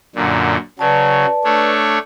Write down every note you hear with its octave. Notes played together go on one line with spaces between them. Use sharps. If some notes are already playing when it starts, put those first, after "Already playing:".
F#2 A#2 D3
C#3 F#3 B4 D5 A5
A3 D4 C#5